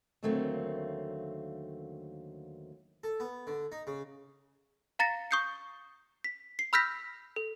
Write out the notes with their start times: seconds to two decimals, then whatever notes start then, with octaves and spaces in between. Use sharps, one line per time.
0.23 D#2 D3 F#3 A3 A#3 C4
3.04 A4
3.20 B3
3.47 D3
3.72 D#4
3.87 C#3
4.99 F5 A#5 A6 A#6 C#7
5.31 C#6 D#6 G6 C7 C#7
6.24 B6
6.59 C7
6.73 B5 E6 F6 G6 A#6 B6
7.36 A4